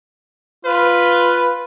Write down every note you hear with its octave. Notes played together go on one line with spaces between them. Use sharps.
F4 B4